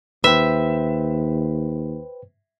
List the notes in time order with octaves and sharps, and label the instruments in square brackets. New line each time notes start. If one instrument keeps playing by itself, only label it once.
[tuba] D#2 [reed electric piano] B4 C5 G5 [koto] E5